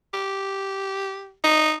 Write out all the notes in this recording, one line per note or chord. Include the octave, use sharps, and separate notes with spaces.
G4
D#4